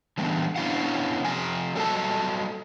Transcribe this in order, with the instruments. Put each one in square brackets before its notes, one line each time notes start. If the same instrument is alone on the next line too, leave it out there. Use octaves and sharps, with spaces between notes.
[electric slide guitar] D3 E3 G3 A3 B3
B3 C#4 D4 E4 F5 F#5
C3 F3 C4 G#5
F#3 G3 A4 B4 D#5 A5